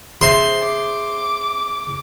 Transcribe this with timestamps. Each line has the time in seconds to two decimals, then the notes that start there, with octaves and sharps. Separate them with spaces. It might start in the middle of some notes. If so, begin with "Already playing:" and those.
0.21 G#4 C5 E5 C6
0.62 D6